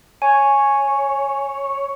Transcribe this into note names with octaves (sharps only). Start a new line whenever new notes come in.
C#5 G#5